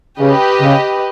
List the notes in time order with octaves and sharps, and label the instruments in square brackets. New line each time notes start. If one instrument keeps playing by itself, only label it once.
[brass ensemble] C#3 [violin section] G4 B4 D#5
[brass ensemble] C#3